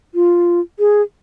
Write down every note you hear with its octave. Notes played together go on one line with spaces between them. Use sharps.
F4
G#4